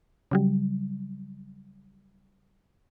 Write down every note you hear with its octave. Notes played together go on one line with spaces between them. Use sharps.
C#3 F#3 G3